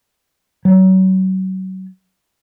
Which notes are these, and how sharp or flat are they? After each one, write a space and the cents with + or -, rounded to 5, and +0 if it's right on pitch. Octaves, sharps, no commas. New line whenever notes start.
F#3 +30